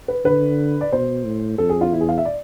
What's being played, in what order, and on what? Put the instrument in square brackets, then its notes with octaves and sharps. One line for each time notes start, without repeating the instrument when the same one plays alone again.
[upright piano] B4
[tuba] D3 [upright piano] B4
[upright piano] D5
[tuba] B2 [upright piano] C5
[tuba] A2
[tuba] F2 [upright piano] A4
[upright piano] G#4
F4
[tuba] E2 [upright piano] E4
[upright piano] G#4
F5
E5
D5